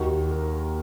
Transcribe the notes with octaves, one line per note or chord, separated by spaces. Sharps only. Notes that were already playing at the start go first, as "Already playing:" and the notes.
Already playing: D#2 D#3 F#4
A#4